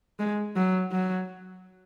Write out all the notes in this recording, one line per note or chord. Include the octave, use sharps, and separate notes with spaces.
G#3
F#3
F#3